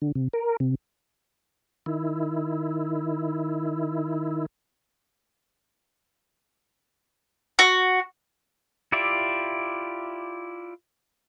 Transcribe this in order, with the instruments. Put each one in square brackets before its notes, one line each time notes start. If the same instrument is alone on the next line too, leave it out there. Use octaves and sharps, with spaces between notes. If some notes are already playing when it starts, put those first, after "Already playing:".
[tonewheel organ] D3
C3
A#4
C3
D#3 E4
[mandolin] F#4
[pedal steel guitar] E4 F4 G4 D5 E5